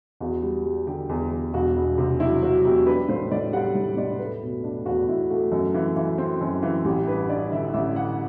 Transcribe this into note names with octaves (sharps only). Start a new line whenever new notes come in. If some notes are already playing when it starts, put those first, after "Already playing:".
E2 F#4
G3
G3
D3 G4
E2
E2
E1 F#4
E1
C3
F#3 E4
F#3 F#4
E1 G4
D4 B4
A2 C5
A2 D5
G3 F#5
A2
A2 D5
A3 B4
B2
D4
E2 F#4
E2 E4
A3 F#4
F#2
E3
E3
C4
F#2
E3
A1 G4
G2 B4
G2 D5
D3 E5
A1 E5
D3 F#5